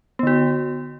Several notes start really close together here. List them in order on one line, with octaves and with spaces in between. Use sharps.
B3 D3 F#4